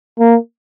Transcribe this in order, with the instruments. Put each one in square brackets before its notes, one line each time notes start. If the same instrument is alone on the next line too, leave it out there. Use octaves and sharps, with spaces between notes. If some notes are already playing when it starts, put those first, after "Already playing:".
[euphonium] A#3